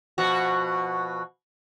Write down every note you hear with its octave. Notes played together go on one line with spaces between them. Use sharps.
B2 F3 F#4